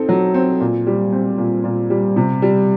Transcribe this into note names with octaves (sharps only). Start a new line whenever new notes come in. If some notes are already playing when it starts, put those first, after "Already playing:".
Already playing: C4 D#4 A4
F#3
C4
A#2
G3
C4
A#2
A#2
G3
C3
G3